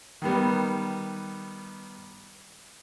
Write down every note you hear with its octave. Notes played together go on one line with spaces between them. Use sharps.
D#3 G3 B3